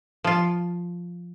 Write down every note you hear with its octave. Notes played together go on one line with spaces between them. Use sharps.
F3 F4